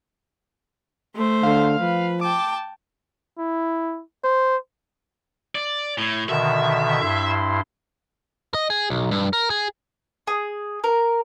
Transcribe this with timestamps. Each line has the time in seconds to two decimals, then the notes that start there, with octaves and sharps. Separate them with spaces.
1.15 A3 C5
1.43 D3 F5
1.80 F3 B4
2.21 G5 A5 D6
3.38 E4
4.24 C5
5.55 D5
5.98 A2
6.29 B2 D3 D#3 E5
7.01 G2 E4 C6
8.54 D#5
8.70 G#4
8.90 B1
9.11 G2
9.33 A#4
9.50 G#4
10.27 G#4
10.84 A#4